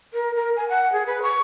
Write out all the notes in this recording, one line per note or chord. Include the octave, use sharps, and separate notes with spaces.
A#4
A#4
G#5
F#5
G#4
B4
C#6